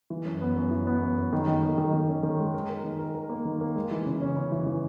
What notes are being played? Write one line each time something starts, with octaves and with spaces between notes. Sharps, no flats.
E3
F#2
B3
F#2
E3
B3
F#2
F#2
D#3
D#3
D#3
D#3
D#3
C#4
D#3
G#3
A#4
A#4
D#3
A#4
A#4
A#3
D#3
A#3
G#3
E3
C#3
C#4
C#3
E3
E3